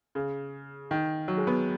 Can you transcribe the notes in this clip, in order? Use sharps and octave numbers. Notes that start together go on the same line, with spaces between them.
C#3
D#3
F#3
G#3
B3